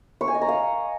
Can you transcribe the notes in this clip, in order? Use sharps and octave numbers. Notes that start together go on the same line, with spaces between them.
C#6
G#5
D#5
A#5
F5